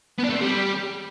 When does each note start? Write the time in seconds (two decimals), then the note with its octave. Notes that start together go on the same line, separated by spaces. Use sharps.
0.18 B3
0.24 D4
0.30 A3
0.36 C4
0.41 G3